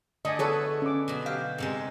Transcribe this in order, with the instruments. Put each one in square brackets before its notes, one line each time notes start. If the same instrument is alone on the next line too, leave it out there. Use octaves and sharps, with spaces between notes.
[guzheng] D3 A3 D4 [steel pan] D#5 G#5
[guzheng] B3 B4 [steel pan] G#4 A4 C#5
[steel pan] C#4 D6
[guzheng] B2 F#3
[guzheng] G4 [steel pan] F5
[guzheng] G#2 C3 G#3